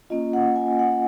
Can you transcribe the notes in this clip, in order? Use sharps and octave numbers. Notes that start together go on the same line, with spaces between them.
A#3 C#4 F4 D#5
F#5
G#5
F#5